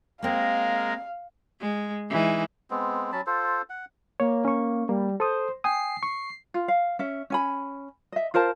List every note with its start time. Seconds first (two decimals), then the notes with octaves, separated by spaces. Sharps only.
0.22 G#3 A#3 C4 A#4 F5
1.60 G#3
2.10 E3 G#3 D#4
2.71 G#3 B3 C4
3.12 F#3 C#4 A5 B5
3.27 F4 A4 C5
3.70 F#5
4.20 A#3 C#5
4.45 C#4 C#6
4.89 G3 A#3
5.20 A4 C5 D#6
5.64 G5 G#5 D#6 C7
6.03 C#6
6.54 F4
6.68 F5
6.99 C#4 E5
7.30 C#4 G#5 B5
8.12 D#5 E5
8.34 F4 A#4 C5 A5